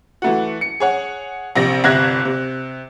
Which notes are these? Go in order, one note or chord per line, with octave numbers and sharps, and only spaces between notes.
E3 A3 F#4
C#7
G#4 C#5 F#5
A#1 C3 A#6
G1 C3 E5 F#6 G#6 A#6
C3